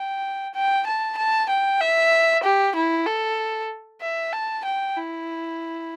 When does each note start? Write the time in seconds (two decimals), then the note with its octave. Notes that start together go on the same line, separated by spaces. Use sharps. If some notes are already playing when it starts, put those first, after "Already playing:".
Already playing: G5
0.54 G5
0.86 A5
1.17 A5
1.49 G5
1.81 E5
2.43 G4
2.75 E4
3.07 A4
4.01 E5
4.32 A5
4.65 G5
4.96 E4